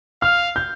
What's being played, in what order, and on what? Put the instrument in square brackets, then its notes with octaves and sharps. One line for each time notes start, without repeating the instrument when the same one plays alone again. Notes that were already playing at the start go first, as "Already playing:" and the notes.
[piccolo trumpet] F5 [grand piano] F6
[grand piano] G6